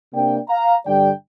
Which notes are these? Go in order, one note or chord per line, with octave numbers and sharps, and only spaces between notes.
C3 A#3 D4 D5 G5
F5 A#5
G2 D3 G3 D4 D5 G5